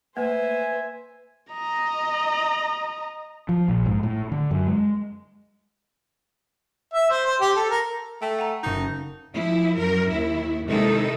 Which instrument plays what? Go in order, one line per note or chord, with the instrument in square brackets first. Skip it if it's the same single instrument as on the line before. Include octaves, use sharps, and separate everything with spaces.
[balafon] A3 A#3 [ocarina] B4 [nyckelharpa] C5 E5 [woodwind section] G#5
[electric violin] D#5 A#5
[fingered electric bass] F3
A#1
G#2
A2
D3
F#2
G#3
[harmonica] E5
C5
C5
G4
A4
A#4
[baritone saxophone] A3 [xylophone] G5
[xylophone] F#5 G#5 A#5
[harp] F#1 C#6 [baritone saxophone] D#4
[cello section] F3 E4
F#2 A#4
D#2 E4
C3 D#3 G#3 D#4 E4 A4